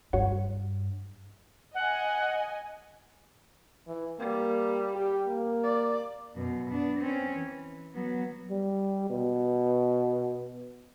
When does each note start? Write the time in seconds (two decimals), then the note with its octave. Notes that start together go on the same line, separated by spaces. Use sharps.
0.13 G2 F#4 C#5 F#5
1.75 D#5 F#5 G#5
3.87 E3
4.19 G3 A#3
4.95 G4
5.27 A#3
5.63 D5
6.35 F#2 B2
6.70 B3 D4
6.99 C4 C#4
7.35 E3
7.95 F#3 B3
8.50 G3
9.10 B2